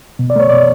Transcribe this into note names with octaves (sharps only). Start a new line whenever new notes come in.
B2
D5
A3 C#5
B2 D5